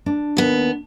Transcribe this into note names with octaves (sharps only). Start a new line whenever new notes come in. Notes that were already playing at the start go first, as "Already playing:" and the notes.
D4
D#2 B3